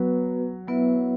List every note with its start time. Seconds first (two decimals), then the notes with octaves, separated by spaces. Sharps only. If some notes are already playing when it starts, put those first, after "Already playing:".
Already playing: F#3 B3 F#4 B4
0.67 F#3 B3 E4 B4 E5